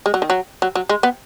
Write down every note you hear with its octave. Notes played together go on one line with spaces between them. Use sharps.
G#3
F#3
D#3
F#3
F#3
F#3
G#3
B3